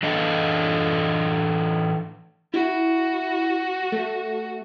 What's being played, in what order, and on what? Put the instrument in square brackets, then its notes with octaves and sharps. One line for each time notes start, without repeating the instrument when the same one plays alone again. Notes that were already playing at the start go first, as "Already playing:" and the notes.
[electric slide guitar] E3 D4 A4 D#5 F5
[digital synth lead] E4 [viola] F#4
[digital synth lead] A3